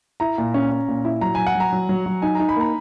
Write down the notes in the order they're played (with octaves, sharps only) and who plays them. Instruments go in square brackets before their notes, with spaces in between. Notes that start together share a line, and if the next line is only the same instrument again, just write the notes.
[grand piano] E4 [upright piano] A#5
[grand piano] A#2
C#4
C#4
A#2
E4
[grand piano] F#3 [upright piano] A#5
[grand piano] F#3 [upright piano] G#5
[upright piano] F#5
[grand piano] F#3 [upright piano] A#5
[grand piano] F#3
F#3
F#3
[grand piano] D#4 [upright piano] G#5
[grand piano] D#4 [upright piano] A#5
[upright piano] B5
[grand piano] A#3 [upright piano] A#5